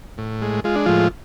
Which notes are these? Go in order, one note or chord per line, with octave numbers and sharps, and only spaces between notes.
A2
G#3
G#3 F4
D4
A2 F3 F4